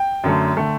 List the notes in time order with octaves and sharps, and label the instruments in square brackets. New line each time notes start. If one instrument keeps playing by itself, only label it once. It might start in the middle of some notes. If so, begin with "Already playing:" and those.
Already playing: [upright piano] G5
F#2 D3 A3
D3 A3